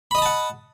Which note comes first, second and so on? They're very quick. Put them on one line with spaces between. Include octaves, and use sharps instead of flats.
B5 D#5 D#6 A5 F#5